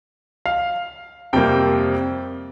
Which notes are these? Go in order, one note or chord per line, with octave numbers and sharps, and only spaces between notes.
F5
F2 C3 G3 A#3 G5